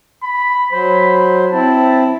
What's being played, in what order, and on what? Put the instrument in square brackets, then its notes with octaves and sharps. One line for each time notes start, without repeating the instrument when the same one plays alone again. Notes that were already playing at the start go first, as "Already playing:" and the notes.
[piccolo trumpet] B5
[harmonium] F#3 C5 [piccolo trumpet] B5
[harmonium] C4 E4 [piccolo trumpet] A5